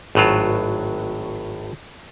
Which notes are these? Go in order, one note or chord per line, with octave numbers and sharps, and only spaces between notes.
G#1 A2 F#3 F4